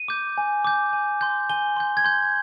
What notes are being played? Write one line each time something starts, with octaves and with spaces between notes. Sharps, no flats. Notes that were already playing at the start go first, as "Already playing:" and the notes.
Already playing: D#7
D6 G6
G#5
D6 G6
G#5
C6 G6
G#5 G7
C6 G6
G#6
C6 G6